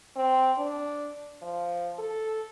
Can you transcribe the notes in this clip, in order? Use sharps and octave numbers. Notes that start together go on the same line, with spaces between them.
C4
D4
F3
A4